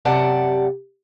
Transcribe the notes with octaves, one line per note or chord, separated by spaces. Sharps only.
F#2 C3 G4 D5 F#5 A5